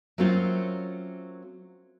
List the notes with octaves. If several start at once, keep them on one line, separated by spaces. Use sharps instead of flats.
F#3 A3 A#3 C4 C#4 F4